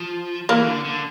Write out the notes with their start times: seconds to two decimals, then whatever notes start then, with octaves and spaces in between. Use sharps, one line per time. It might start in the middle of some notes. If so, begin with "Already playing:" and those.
Already playing: F3
0.49 E3 A#3
0.67 D3
0.85 D3